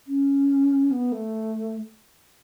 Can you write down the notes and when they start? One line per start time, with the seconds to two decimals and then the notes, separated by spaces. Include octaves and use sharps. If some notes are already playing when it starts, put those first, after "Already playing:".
0.07 C#4
0.91 B3
1.12 A3